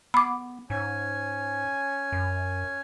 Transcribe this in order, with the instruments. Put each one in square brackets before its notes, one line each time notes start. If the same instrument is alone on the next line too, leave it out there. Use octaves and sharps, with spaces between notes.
[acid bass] B3 [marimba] B5 D6
[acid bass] G#2 [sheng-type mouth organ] C#4 G#5
[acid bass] F#2